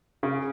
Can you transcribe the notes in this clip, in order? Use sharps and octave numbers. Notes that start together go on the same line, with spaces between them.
C#3